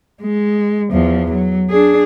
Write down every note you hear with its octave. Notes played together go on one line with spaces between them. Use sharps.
G#3
E2 F3
F#3
D4 G#4